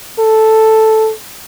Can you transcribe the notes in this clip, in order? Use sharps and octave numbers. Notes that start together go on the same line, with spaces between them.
A4